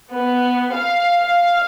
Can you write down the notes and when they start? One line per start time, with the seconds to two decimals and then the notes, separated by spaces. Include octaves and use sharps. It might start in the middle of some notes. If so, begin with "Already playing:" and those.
0.15 B3
0.76 F5
1.21 F5